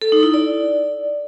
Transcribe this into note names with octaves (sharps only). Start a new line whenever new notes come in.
A4
D#4
E4
D5